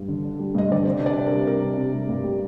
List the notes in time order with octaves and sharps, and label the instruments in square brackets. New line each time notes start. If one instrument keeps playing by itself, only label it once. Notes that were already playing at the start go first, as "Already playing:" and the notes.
Already playing: [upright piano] G2
D3
D4
G3
[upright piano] G2 [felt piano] D#5
[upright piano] D3 [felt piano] D5
[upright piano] C3 [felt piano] C5
[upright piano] D4
[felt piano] D5
[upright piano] C3
[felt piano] A#4
[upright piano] G3
[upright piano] C3 [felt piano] A#4
[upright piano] D4
C3
G3
G2
G3